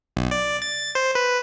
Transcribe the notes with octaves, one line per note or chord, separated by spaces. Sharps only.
B1
D5
A6
C5
B4